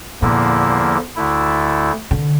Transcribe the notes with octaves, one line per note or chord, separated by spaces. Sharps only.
E2 A#2 D3 F3 A#3 E4
D2 D3 A3 E4
D3